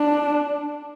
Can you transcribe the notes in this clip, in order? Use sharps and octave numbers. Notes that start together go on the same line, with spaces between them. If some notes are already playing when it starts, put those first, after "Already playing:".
Already playing: D4